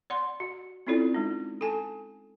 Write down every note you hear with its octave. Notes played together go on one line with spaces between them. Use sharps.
D5 F#5 C6
F#4
C4 C#4 E4 F4 A4 D5
G#3 D#4
A4 G#5 A5